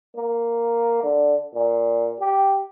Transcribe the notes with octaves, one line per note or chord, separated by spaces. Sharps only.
A#3
D3
A#2
G4